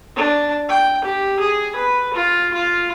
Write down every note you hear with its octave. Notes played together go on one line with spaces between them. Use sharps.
D4
G5
G4
G#4
B4
F4
F4